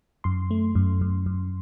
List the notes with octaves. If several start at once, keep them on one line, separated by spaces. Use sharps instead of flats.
F#2 C6
A3
F#2
F#2
F#2